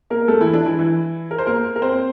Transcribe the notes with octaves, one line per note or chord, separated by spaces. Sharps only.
A#3 A#4
A3 A4
E3 E4
D4
E3 E4
E3 E4
A#4
C5
A#3 A#4
A#4
C4 C5